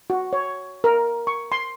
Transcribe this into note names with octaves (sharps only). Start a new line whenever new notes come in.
F#4
C#5
A#4
C#6
C6